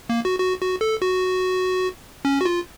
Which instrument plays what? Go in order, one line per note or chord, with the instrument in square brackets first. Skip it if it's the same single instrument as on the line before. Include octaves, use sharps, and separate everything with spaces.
[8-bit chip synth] A#3
F#4
F#4
F#4
A4
F#4
C#4
F#4
F4